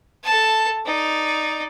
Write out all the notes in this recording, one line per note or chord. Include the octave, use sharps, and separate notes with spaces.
A4 A5
D#4 D5